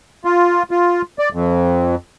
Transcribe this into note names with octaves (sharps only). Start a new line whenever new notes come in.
F4
F4
D5
F2